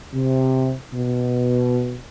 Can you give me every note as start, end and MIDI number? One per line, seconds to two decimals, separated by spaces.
0.13 0.72 48
0.93 1.97 47